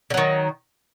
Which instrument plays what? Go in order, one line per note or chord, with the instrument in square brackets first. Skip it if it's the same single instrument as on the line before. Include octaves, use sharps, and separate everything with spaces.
[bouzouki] D3
F#3
D#3